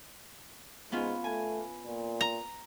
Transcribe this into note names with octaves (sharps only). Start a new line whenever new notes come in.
G#2 B3 C#4 F4
A3 G#5
A#2
A#5